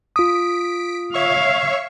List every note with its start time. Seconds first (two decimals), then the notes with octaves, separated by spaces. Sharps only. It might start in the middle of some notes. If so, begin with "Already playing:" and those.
0.16 F4 D#6 B6 D7
1.14 C#5 E5 F5 C#6